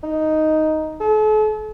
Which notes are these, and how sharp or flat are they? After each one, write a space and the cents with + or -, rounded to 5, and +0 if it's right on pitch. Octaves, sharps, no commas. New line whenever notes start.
D#4 +0
A4 -45